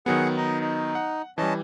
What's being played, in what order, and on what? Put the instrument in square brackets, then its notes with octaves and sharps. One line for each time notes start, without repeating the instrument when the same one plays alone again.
[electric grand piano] D#3 F#3 B3 [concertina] G#4 F#5
[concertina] D#4 D#5
D#4
[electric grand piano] F#5
[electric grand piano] E3 G3 [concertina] C#4 D#5 A5